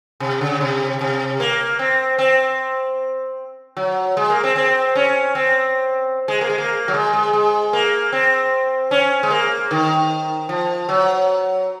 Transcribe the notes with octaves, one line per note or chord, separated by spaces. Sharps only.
C3
C#3
C3
C3
A#3
C4
C4
F#3
G#3
A#3
C4
C4
C#4
C4
G#3
A#3
G#3
A#3
F#3
G#3
G#3
G#3
A#3
C4
C#4
G#3
A#3
D#3
F3
F#3